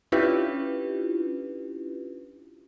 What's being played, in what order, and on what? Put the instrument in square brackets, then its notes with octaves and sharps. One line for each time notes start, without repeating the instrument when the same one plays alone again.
[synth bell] C#4 D4 E4 F4 G4 B4